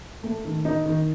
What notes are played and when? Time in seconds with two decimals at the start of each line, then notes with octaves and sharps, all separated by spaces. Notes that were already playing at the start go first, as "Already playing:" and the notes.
0.23 A3
0.45 D#3
0.65 D#4
0.86 D#3